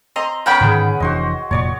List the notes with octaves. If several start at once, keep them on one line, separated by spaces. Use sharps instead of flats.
C4 D#5 A#5 C6
B3 C#4 A#4 F#5 G5 B5
G#2 D3 D#3 G#4 B4
F1 E3 D4 F#4 C5 D#5
F1 A#2 C#5 D5 C#6